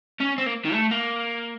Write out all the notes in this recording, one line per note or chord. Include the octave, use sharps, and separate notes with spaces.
C#4
C4
A#3
D#3
A3
A#3